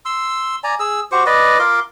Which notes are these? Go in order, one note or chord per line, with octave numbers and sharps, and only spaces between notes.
C6 E6
D5 G#5 A#5
G#4 E6
F#4 G4 C5 C#6
B4 D5 D#5
F4 A#4 C6 D6